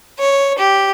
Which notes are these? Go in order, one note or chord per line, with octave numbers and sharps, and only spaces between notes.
C#5
G4